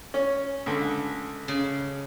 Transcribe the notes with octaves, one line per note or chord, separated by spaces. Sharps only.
C#4
C#2 D3
C#3